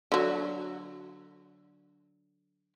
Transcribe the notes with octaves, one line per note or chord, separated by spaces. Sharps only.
D3 F#3